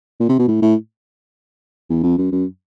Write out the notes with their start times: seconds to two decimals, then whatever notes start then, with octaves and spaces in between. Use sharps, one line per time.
0.20 A#2
0.29 C3
0.39 B2
0.48 A2
0.62 A2
1.90 E2
2.04 F2
2.18 F#2
2.32 F#2